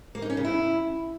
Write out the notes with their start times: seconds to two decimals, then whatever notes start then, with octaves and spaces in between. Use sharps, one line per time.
0.15 A#3
0.22 D#4
0.30 C#4
0.37 C#3
0.45 E4